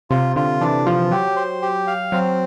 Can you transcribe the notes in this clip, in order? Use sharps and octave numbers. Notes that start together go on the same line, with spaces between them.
C3 F4
D3 F4
E3 D4
F3 F4
F#3 G4
C5
G4
F5
F#3 C4